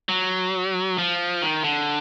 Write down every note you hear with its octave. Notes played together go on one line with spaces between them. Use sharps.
F#3
F3
D#3
D3